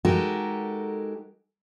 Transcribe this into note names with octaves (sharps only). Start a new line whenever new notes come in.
G#3 D#4 F#4 G4 A4 A#4